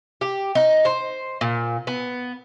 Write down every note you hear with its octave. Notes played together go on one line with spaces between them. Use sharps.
G4
D#4
C5
A#2
B3